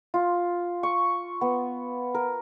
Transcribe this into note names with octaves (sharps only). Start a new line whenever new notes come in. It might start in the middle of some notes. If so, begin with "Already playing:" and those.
F4
C#6
B3
A#4